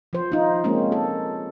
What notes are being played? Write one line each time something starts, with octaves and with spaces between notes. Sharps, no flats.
F3 C5
D#4 F4
G#3 A#3 C4 C#4
A4